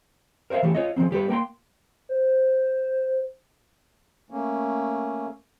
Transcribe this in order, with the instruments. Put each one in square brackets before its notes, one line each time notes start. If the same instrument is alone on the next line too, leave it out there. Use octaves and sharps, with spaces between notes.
[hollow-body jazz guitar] A#4 C5 C#5 E5 F5
C#3 E3 A3 G4
F4 C#5 D#5
C#3 F3 F#3 A#3 C4
G3 G4 A4 B4
A#3 G5 A#5 C6
[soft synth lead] C5
[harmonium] A3 A#3 C#4